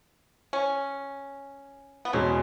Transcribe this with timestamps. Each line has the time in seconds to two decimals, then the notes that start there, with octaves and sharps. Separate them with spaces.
0.53 C#4
2.05 B3
2.13 E2 B2 G#3 C#4